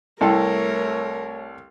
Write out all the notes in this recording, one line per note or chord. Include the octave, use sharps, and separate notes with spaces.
C2 A3 E4 A4 A#4 C#5 G5